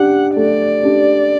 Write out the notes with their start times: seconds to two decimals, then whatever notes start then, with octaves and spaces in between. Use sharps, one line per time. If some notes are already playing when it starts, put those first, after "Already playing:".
Already playing: D4 G4 F#5
0.36 A3 D5
0.83 D4 G4